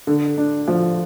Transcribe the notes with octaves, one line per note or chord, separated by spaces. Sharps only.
D3
D4
F3